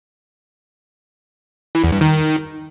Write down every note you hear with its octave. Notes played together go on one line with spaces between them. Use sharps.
E3
E2
G2
D#3